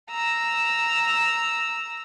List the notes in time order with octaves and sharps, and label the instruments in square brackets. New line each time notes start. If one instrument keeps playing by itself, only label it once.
[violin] A#5 E6